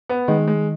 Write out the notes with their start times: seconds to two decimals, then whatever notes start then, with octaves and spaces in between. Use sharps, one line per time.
0.09 B3
0.28 D#3 G#3
0.47 G#3